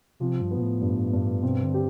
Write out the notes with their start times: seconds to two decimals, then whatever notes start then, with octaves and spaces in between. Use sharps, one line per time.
0.20 C3 F3
0.41 G2
0.51 B3
0.57 B2
0.62 A2
0.81 G2
1.13 G2
1.43 B2 C4
1.63 D3
1.74 G4